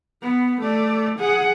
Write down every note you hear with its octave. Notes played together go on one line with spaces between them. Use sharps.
B3
A3 D5
G#4 F#5